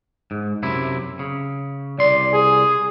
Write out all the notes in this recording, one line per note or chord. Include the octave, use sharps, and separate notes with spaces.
G#2
F#2 C3 E4
C#3
C2 D5 C6
G#4